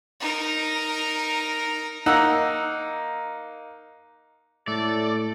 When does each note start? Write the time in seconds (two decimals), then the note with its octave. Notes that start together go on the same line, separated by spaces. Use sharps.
0.20 D#4 A#4
2.06 A#3 D#4 F#5 E6
4.68 A2 A3 A4 D5